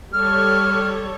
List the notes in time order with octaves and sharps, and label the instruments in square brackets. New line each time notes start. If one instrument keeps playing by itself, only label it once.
[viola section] G3 A4 C#5 [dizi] F6